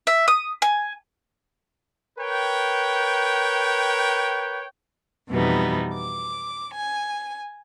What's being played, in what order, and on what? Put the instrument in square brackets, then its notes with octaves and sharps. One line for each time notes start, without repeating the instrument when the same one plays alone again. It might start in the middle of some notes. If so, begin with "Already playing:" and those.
[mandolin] E5
D#6
G#5
[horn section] A#4 B4 C#5 G5
[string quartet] F2 B2 E3 G3 B3 D#4
D6
G#5